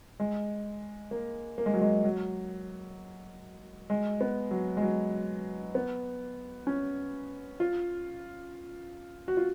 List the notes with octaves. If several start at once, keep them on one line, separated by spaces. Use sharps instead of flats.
G#3
A#3
A#3
G#3
F#3
G#3
F#3
G#3
B3
F#3
G#3
F#3
B3
C#4
F4
F#4
F4